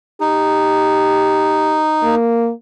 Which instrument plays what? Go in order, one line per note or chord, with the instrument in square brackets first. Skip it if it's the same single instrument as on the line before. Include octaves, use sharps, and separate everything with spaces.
[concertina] D#4 [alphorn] G4
[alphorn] A#3